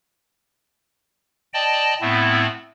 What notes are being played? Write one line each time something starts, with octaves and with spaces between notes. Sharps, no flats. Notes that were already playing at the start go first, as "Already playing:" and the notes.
D5 D#5 G5 A5
A2 A3 B3 C4 E4